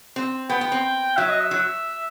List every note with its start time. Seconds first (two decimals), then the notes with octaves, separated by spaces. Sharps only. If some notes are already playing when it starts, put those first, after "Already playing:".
0.16 C4
0.49 B3 G5
0.61 B3
0.72 C4
1.17 F#3 E5
1.29 D#5
1.40 E5
1.51 F#3